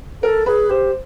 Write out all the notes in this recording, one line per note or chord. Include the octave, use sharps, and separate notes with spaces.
A4 A#4
G#4 B4
G4 C5